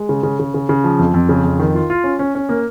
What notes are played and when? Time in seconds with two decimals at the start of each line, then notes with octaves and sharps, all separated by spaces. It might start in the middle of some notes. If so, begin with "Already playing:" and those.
Already playing: G#3
0.09 C#3
0.23 C#3
0.40 C#3
0.54 C#3
0.69 C#3
0.84 F3
0.99 F2
1.14 F2
1.29 C#3
1.44 F2
1.59 D#3
1.75 F4
1.90 F4
2.04 C#4
2.19 C#4
2.35 C#4
2.49 A#3